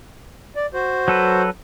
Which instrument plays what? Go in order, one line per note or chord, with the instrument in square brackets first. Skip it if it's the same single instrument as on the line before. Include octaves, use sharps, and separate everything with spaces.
[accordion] D5
F#4 C5
[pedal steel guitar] F#3 A4 B4